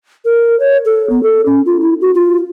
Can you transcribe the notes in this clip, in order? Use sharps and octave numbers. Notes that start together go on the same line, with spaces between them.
A#4
C#5
A4
B3
A4
C#4
F4
E4
F#4
F4